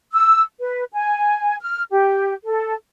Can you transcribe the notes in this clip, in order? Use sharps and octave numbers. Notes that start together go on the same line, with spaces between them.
E6
B4
G#5
F6
G4
A4